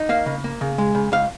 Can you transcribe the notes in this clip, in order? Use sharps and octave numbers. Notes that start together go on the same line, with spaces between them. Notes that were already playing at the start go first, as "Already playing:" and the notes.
Already playing: D#4
A#3 F5
C#3
A#3
C#3
G#3
C#3
C#2 F5